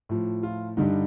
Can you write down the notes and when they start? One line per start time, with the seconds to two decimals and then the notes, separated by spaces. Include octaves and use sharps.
0.09 A2 F3
0.43 F4
0.77 G2 D3 G3 D#4